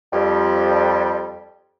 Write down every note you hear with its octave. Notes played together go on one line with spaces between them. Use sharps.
F2 G3